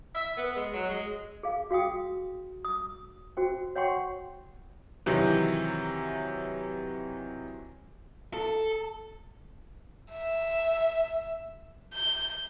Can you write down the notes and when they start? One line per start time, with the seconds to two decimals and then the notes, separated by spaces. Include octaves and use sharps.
0.15 E5
0.37 B3
0.55 G#3
0.74 F#3
0.89 G#3
1.43 G#4 F5
1.71 F#4 F5 G5 D#6
2.65 D#6
3.37 F#4 C5 G5
3.76 C#5 F#5 G5 C6 C#6
5.06 C3 D#3 E3 F#3
8.34 A4
10.12 E5
11.93 G6